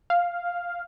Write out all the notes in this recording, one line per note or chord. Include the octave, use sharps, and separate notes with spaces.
F5